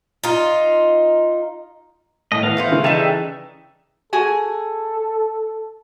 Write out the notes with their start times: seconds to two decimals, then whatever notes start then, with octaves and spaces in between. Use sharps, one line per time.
0.23 D#4 F4
2.32 A2 D#5
2.43 E3 B3 F5
2.57 A3 E4 C5
2.71 C#3 E3
2.84 G3 G#3 D#4 A4 E5
4.13 F#4 G#4 A4 G#5